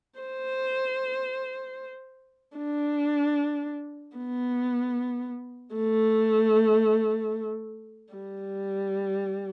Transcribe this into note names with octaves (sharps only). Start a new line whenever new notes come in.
C5
D4
B3
A3
G3